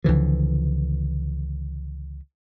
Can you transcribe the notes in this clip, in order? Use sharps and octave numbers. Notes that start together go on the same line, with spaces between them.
C#2 D3 E3 F3